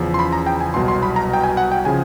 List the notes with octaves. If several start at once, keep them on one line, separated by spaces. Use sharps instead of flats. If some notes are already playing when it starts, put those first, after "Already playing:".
Already playing: E2 C#3 F3
C6
B5
A#5
G5
G#5
C2 B2 F#3 C6
C6
B5
A#5
G5
G#5
F#5
G5
C#3 F3 G#5